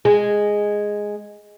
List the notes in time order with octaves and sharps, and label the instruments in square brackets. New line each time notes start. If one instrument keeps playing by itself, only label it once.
[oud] G#3